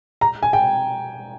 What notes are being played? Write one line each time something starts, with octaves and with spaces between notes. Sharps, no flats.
A#5
G#5
G5